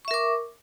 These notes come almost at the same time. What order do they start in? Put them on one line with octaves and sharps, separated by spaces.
C#6 E5 A#4 D6